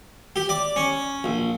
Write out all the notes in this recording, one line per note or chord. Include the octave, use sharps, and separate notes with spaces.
G4
D5
C#4
A#1